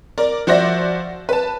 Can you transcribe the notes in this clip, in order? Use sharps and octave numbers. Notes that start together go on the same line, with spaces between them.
A#4 D5
F3 F#4 C5 D5 E5 A#6
B4 A5